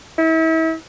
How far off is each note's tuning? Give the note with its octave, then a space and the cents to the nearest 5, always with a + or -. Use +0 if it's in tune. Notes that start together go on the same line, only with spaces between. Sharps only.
E4 -35